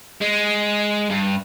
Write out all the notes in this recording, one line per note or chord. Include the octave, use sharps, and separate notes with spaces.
G#3
G2